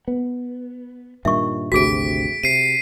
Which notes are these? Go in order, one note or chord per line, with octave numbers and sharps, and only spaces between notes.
B3
G2 A#2 D#3 E5 C#6
G#1 D2 C3 F#4 G#4 B6 D7
C3 C7 D#7